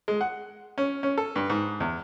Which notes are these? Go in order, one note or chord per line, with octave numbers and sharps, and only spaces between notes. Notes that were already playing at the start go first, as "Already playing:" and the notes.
G#3
F#5
C#4
C#4
A4
G2
G#2
E2